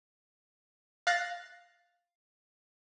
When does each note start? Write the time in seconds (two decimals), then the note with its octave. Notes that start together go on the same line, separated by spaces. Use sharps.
1.07 F5 F#6 A6 A#6 C7